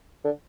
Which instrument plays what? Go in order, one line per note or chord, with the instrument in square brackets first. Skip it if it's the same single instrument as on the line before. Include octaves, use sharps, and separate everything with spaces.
[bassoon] D3